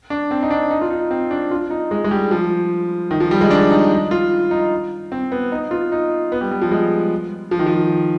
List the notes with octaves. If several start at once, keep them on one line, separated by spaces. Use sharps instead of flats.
D4
C4
D#4
D4
D#4
F4
D#4
C4
D4
F4
D#4
G#3
G#3
G3
F3
D#3
F3
G3
G#3
D4
D#4
D#4
F4
D#4
C4
B3
D#4
F4
D#4
B3
G3
G3
F3
G#3
F3
D#3
F3